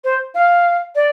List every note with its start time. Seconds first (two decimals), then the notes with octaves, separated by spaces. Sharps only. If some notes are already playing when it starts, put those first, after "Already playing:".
0.04 C5
0.34 F5
0.95 D5